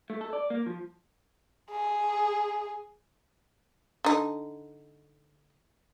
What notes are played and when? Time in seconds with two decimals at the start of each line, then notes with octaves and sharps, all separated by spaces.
0.10 A3
0.21 A4
0.33 D5
0.50 A#3
0.66 F3
1.70 G#4
4.05 D3 D#4